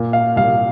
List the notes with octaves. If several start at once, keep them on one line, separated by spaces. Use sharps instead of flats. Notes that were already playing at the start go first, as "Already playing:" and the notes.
Already playing: A#2
F5
C2 F5